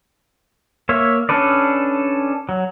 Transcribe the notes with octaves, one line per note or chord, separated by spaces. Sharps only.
A#3 C#5 E5
C#4 D4 A4 B4 D5
F#3